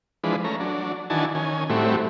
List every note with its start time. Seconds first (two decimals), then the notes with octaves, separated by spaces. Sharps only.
0.24 E3 F3 G#3 D4 B4
0.44 A3 C#4 A#5
0.60 F#3 D4
1.10 D#3 E3 D4 F#4 G#5 A5
1.35 D#3 C#4 G#5
1.69 A2 G3 A3 C4 E4 F#4